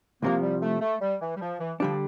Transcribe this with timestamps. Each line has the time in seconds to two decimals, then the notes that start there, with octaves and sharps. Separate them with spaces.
0.22 C2 C3 F3 A#3
0.42 G3
0.62 A3
0.81 A3
1.02 G3
1.21 E3
1.36 G3
1.41 F3
1.60 E3
1.79 D3 F3 G3 D4